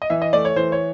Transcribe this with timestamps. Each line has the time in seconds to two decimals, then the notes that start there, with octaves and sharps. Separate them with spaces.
0.02 D#5
0.10 E3 E5
0.22 D#5
0.33 A3 D5
0.45 C#5
0.56 E3 C5
0.72 C#5